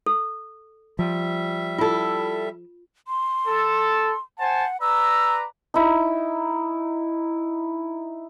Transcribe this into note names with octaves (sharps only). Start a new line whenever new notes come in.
A4
F3 G3 E5
E4 F4 A4
C6
A4
C5 F#5 G#5 A5
B4 D5 A#5 E6
D#4 E4